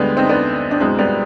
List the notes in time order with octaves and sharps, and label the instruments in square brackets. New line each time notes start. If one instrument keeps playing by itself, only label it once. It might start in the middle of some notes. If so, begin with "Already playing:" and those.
Already playing: [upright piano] D2 D3 G3 G#3 B3
C4 D#4
B3 D4
D4
C2 B2 G#3 C4
G3 B3